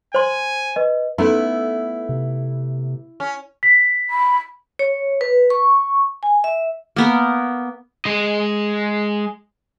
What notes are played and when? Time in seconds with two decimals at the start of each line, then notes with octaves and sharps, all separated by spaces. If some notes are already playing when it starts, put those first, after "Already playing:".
0.14 C5 G#5 C6
0.76 B4 D#5
1.18 A3 B3 C#4 D#4 E4 A4
2.09 C3
3.20 C#4
3.63 B6
4.10 B5
4.79 C#5
5.21 B4
5.50 C#6
6.23 G#5
6.44 E5
6.96 A#3 B3 A#4
8.06 G#3 D#5